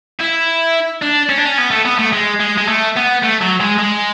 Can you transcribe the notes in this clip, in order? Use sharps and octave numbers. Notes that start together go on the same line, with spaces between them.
E4
D4
C#4
D4
C#4
B3
A3
B3
A3
G#3
G#3
G#3
A3
B3
A3
F#3
G#3
G#3